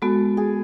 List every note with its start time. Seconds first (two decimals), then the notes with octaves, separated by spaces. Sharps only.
0.02 G#3 B3 F#4 A4
0.37 G#4